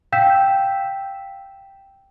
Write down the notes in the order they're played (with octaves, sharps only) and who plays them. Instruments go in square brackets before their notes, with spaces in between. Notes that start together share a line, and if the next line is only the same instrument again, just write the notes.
[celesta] F5 G5 E6 G6 B6 E7